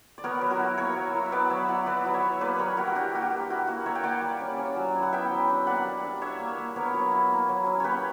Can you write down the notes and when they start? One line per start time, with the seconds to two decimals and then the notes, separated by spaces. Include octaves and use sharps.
0.18 D5
0.24 B3 A#4 C#5
0.41 F#3 B4
0.50 F#4 A#4
0.59 E4
0.78 A#3 A#4 C#5
0.96 F#3
1.14 E4
1.26 E5
1.32 B3 B4 D5
1.50 F#3 C#5 E5
1.68 E4 D5 F#5
1.86 B3 B4 D5
2.05 F#3
2.14 C#5 E5
2.23 E4
2.41 A#3 B4 D5
2.59 G3 A#4 C#5
2.77 E4 F#4 A#4
2.95 D4 G4
3.14 A#3 F#4
3.22 G4
3.32 A#3
3.49 E4 F#4
3.67 A#3 F#4
3.86 A#3 C#5 E5
3.95 G5
4.04 A#3 D5 F#5
4.22 G3
4.41 C#4
4.58 C#4
4.76 F#3
4.95 E4
5.03 F#5
5.13 B3 E5 G5
5.31 F#3
5.49 D4
5.67 A#3 D5 F#5
5.85 G3
6.04 D4
6.22 D4 C#5 E5
6.39 A#3
6.58 A#3
6.76 B3 A#4 C#5
6.94 F#3
7.12 E4
7.31 A#3
7.49 F#3
7.66 C#4
7.80 A#3 G4 B4 C#5